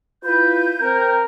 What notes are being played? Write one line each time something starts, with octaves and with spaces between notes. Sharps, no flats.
E4 F4 B4 G6
C4 A#4